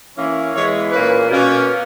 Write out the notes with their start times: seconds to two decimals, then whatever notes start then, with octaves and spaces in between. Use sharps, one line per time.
0.17 E3 A#3 C#4
0.55 E3 G#3 B3 C#5
0.92 A#2 A#3 C#4 B4
1.29 B2 A#3 C#4